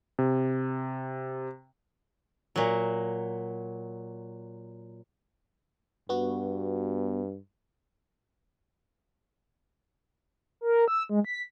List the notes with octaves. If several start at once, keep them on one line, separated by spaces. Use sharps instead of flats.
C3
A#2 F#3
G2 B3 F#4
A#4
E6
G#3
B6